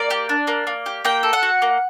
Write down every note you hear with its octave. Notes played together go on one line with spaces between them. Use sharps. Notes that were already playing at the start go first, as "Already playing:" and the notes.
Already playing: A#3 D5
G4
D4
A#3
A#3
G4
A#3 G5
A4
F#5
F#4
A#3